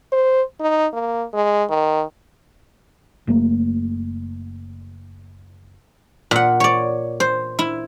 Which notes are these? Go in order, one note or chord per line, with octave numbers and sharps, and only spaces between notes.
C5
D#4
A#3
G#3
D#3
F#1 A3 A#3
A#2 F#5
C#5 D5
C5
E4